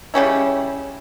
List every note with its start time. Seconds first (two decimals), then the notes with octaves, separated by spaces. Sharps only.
0.14 C#3 G3 C#4 E4